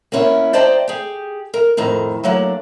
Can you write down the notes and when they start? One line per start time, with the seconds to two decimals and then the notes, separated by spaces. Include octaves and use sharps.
0.12 A#3 B3 C#4 E4
0.53 C5 D5 D#5 G5 A5 A#5
0.88 G4 G#4
1.54 A#4
1.77 F2 A2 D#3 A#5
2.24 F#3 A3 A#3 D4